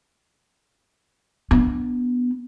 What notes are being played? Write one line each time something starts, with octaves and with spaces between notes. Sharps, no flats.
B3 D4